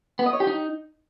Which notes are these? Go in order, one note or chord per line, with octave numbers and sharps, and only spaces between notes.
B3
D#5
C#5
G4
D#4